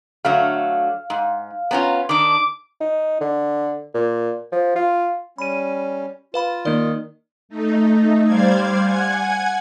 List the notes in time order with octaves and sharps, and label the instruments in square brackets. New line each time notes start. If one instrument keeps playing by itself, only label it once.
[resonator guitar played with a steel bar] D3 F#3 A3 [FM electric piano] F5
[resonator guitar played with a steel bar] G#2
[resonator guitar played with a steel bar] B3 C#4 F4 [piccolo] A#5
[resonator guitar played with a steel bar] D#3 D4 [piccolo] D6
[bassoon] D#4
D3
A#2
F3
F4
[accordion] G3 C#4 [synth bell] B5 D#7
[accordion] F4 [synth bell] B4 F5 B5
[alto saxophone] D#3 [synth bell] A#3 D5
[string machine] A3 D#4
G3 C5 D5 F5 G#6
F#5 G#5 G#6